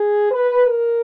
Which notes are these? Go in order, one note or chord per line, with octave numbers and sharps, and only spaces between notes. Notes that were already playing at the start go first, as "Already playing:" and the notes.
Already playing: G#4
B4
A#4